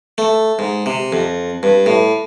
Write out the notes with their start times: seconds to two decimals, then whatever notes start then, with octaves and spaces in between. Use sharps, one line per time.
0.18 A3
0.59 G#2
0.86 C3
1.12 F2
1.63 G2
1.86 A2